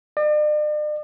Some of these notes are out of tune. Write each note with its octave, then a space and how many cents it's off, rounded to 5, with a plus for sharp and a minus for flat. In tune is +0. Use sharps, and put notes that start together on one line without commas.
D5 +45